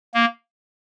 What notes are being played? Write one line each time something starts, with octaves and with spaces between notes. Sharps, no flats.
A#3